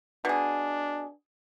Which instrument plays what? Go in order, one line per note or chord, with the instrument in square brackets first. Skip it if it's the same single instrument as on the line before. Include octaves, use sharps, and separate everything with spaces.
[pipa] B2 G#4 [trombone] D4